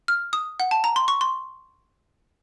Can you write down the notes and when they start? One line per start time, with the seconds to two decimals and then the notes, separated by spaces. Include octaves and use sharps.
0.08 F6
0.33 D#6
0.60 F#5
0.71 A5
0.84 A#5
0.96 C6
1.08 C#6
1.21 C6